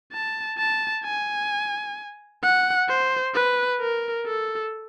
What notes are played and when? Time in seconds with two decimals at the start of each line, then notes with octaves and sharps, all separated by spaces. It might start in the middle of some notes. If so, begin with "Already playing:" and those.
0.12 A5
0.58 A5
1.04 G#5
2.43 F#5
2.88 C5
3.34 B4
3.80 A#4
4.26 A4